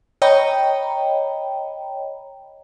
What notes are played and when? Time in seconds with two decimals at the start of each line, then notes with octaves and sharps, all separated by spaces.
0.22 C#5 D#5 G5 A#5 B5